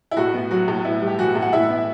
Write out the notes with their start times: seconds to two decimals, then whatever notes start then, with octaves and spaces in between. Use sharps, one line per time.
0.11 E4
0.17 A2 F#4
0.34 B3
0.51 F#3 F#4
0.68 A2
0.85 B3 E4
1.02 G3
1.07 G4
1.19 E3 F#4
1.35 A2
1.42 F#5
1.53 A2 E4 E5
1.70 B3